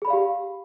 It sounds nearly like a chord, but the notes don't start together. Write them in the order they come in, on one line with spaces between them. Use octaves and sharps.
G#4 B5 D5 F5 G4